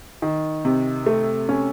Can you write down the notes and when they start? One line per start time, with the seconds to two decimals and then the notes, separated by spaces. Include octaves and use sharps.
0.22 D#3
0.65 C3
1.06 A3
1.49 C#4